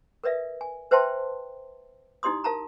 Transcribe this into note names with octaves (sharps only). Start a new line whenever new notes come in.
A#4 B4 D5 E5 F5
G#5
B4 C5 E5 G5 A5 C6
D#4 E4 G4 D5 C6 D#6
A#4 F5 A5 A#5